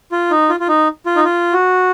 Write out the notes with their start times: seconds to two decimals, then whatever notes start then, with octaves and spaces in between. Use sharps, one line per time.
0.12 F4
0.31 D#4
0.49 F4
0.60 F4
0.68 D#4
1.06 F4
1.16 D#4
1.24 F4
1.53 F#4